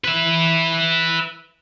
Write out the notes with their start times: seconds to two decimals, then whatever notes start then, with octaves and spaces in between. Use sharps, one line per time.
0.04 B4 E5